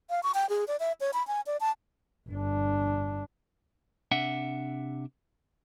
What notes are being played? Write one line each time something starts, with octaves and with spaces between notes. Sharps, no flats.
F5
C#6
G5
G#4
D5
E5
C#5
B5
G#5
D5
A5
G1 D4
C3 D4 E5 F#5